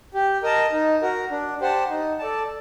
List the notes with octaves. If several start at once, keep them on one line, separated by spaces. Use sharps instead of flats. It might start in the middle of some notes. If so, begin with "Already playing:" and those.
G4
A#4 D#5 A5
D#4
F#4 A#4
D4
G4 C5 F#5 A5
D#4
A4 D5 A5